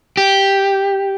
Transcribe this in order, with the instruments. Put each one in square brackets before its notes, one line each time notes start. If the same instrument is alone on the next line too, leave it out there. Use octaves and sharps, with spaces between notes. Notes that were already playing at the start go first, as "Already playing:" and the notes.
[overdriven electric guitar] G4